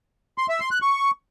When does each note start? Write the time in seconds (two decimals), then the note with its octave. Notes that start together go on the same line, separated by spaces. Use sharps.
0.38 C6
0.49 E5
0.60 C6
0.71 F#6
0.82 C#6